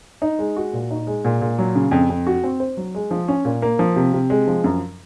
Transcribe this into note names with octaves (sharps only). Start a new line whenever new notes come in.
D#4
G#3
F#4
A#2
D#4
G#3
A#2
A#2
F#3
C#3
F2
F2
F#4
C4
C5
F#3
G#3
F3
C#4
A#2
A#3
F3
C3
C3
G#3
F3
F#2